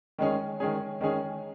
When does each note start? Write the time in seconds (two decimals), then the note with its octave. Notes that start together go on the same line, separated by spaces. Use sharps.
0.19 D#3 G#3 C#4 G#4
0.60 D#3 G#3 C#4 G#4
1.01 D#3 G#3 C#4 G#4